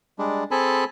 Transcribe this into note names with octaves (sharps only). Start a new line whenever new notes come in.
G3 G#3 D4
C4 G#4 A4 G#5 A5 B5